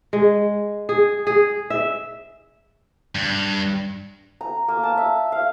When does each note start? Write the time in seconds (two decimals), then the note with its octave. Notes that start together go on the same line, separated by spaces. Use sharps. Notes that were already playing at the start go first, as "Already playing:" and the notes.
0.13 G#3
0.89 G#4
1.27 G#4
1.70 E5
3.15 G2
4.41 A#5
4.68 A#3
4.83 A5
4.97 E5
5.32 F5